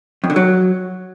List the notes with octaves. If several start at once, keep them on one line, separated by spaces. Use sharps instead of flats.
F2
D3
F#3